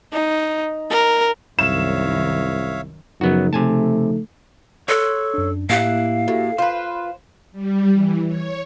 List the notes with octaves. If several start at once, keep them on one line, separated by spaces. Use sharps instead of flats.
D#4
A#4
C2 F#2 D#3 C#5 E5 F5 E7
F#2 C#3 F3 F#3 B3 D#4 F#4
C3 A3 G#5 A5
A4 C#5 C6 F#6
F#2 D4
A2 A#3 E4 G4 F5 F#6
A2 F#4 G4
F4 B4 C5 C6
G3
E3
C#5